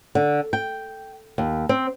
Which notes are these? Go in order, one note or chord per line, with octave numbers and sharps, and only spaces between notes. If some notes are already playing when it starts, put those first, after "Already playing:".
D3
G5
D#2
C4